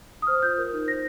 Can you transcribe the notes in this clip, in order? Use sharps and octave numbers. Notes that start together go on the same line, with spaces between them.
D#6
C5 F6
F4 G6
A#4
D#4
C5 A#6